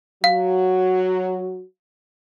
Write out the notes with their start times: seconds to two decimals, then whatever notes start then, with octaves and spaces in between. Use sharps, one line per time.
0.24 F#3 F#4 F5